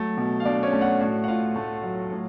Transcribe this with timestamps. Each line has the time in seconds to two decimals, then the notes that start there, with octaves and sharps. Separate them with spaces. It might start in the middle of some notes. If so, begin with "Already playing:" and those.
Already playing: F#3 A3
0.17 B2
0.40 F5
0.45 B2 D4 D5
0.63 C#4 C#5
0.73 A3
0.81 F#4 F#5
1.00 A2 F#4 F#5
1.24 F#5
1.28 A2 F4 F5
1.56 A3
1.83 F#3
2.11 A2